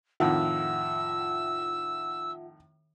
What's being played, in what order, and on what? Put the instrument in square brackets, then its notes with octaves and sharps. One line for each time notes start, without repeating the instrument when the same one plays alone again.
[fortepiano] F2 A2 D#3 [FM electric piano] F4 E5 F#5 [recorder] E6